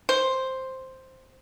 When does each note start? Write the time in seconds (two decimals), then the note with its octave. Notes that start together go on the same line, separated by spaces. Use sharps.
0.09 C5